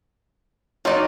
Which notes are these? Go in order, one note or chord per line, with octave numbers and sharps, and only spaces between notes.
F#3 D#4 F4 D5